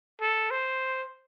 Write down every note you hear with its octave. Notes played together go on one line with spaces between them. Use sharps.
A4
C5